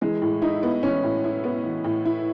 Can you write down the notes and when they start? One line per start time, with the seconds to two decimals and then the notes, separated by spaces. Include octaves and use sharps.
0.01 E3 G#3
0.22 A2
0.42 D#4 E4
0.63 B3
0.83 E3 C#4
1.03 A2
1.24 E4
1.44 B3
1.64 E3
1.84 A2
2.05 E4